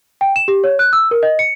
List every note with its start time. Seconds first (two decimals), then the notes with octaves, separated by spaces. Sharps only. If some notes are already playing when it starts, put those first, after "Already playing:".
0.21 G5
0.36 E7
0.48 G4
0.64 C#5
0.79 F#6
0.93 E6
1.11 A#4
1.23 D#5
1.39 C#7